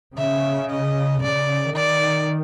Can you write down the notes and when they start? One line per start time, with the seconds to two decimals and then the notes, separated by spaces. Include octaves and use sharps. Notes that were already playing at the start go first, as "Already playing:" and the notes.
0.18 C#3 E5
0.71 D#5
1.22 C#3 D5
1.75 D#3 D5